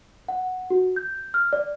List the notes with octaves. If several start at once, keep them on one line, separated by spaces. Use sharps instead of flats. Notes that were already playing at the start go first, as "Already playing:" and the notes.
F#5
F#4
G6
F6
D5